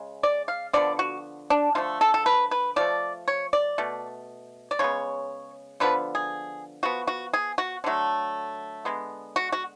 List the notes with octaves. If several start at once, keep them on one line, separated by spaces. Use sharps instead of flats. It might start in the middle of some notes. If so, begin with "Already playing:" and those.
Already playing: C#3 G#3
D5
F5
D3 F3 B3 D5
F#4
D4
D3 F3 A3 F4
A4
A4
B4
B4
F3 A3 D5
C#5
D5
B2 A3
D5
C#3 G#3 B3 C#5
D3 F3 B3 B4
G#4
F3 B3 F#4
F#4
G#4
F#4
D3 F#3 A3
D3 G#3 B3
F#4
F#4